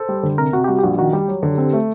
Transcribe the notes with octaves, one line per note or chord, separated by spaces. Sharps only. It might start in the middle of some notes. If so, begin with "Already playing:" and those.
Already playing: A4 C5
G3
D3
C3 A#4
C3 F#4
G4
G3 F#4
G4
A#1 F#4
D#3 F#4
G3 G4
F#3
D3
C4
A3